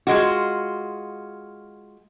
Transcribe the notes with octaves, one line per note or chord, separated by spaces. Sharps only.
G#3 F4 F#4